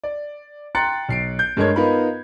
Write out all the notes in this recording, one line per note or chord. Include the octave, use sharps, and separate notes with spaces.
D5
G5 A#5 C6 F#6 A6 C#7
B1 C7 D7
G6
G2 G#3 A3 A#4 C#5 G#6
B3 D#4 F4 A#4 B5